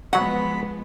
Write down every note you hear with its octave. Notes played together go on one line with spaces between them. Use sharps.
B2 F3 F#3 G#3 B3 F#5 B5